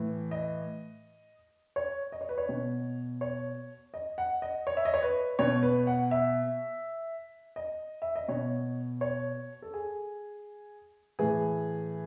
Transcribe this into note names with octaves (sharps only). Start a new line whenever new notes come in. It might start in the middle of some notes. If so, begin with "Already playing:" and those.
Already playing: A2 E3
D#5
C#5
D#5
C#5
B4
C#5
B2
C#5
D#5
F#5
D#5
C#5
E5
D#5
C#5
B4
B2 C#5
B4
F#5
E5
D#5
E5
D#5
B2 C#5
C#5
A4
G#4
A2 E3 G#4